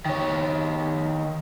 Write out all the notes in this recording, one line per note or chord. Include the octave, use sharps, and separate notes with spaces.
D#3 C#5